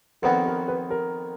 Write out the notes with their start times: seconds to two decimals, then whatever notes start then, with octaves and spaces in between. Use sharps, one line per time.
0.22 F2 D#3 F#3 B3 F#4 B4
0.46 A#4
0.68 B4
0.90 A#4